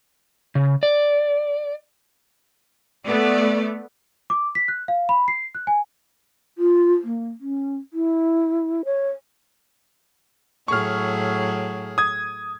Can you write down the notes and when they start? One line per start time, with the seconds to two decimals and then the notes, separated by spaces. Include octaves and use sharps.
0.55 C#3
0.83 D5
3.07 A3 B3 D5
4.30 D6
4.55 B6
4.68 F#6
4.88 F5
5.09 B5
5.28 C7
5.55 F#6
5.67 G#5
6.58 F4
7.04 A#3
7.40 C#4
7.93 E4
8.85 C#5
10.68 A2 F#3 G#4 C#6 F6
11.98 D#6 G#6